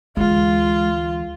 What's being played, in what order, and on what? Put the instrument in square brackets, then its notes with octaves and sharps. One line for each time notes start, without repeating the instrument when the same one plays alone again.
[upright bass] D2 E3 [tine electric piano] G#3 [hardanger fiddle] F4